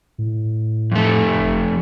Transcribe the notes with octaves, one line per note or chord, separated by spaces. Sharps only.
A2
F2 A3
F#1